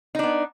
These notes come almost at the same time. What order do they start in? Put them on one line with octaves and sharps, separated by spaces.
D#4 D4 B3